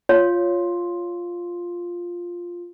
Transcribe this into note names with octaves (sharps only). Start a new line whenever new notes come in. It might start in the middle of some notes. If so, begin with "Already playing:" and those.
F4 C#5